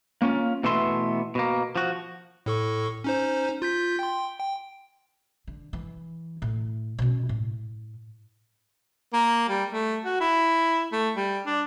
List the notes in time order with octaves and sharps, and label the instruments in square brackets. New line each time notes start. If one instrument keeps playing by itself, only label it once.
[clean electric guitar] A#3 C#4 F4
B2 E3 A3 B3 E5 C6
B2 A#3
F3 F#4
[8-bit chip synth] A2 A4 C#6
C#4 D#4 C5
F4 G6 B6
G5 C6
G5
[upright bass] D3
E3
A2
B2 C#4
A2
[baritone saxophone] A#3
G3
A3
F#4
E4
A3
G3
D4